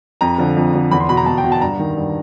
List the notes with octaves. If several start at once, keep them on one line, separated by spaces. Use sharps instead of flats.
F2 A#5
D3 F3
F2
D3 F3
E2 B5
C6
B2 B5
A#5
E2 A5
G5
B2
A5
G2 A#5
D#3
G2